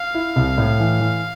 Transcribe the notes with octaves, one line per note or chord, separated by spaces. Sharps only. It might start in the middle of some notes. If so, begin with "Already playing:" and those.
Already playing: F5
E4
C2
A2
E3
E3